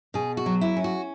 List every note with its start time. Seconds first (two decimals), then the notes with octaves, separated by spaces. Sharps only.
0.14 B2 G#4
0.37 F#4
0.46 F#3
0.61 E4
0.76 C#4
0.84 F#4